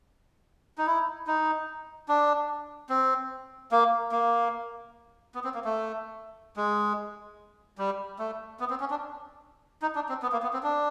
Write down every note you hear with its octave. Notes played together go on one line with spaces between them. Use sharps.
D#4
E4
D#4
D4
C4
A#3
A#3
B3
C4
A#3
A3
G#3
G3
A3
B3
C4
C#4
D4
D#4
D4
C4
B3
A#3
B3
C4
D4